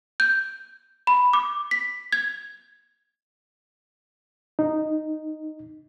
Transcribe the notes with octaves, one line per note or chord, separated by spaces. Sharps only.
G6
B5
D6
B6
G#6
D#4